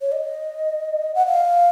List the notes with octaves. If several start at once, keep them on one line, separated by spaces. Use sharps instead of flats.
C#5
D#5
F#5
F5